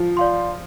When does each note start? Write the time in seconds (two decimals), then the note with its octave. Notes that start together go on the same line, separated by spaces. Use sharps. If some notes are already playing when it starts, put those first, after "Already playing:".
Already playing: F3
0.17 D5 F5 C6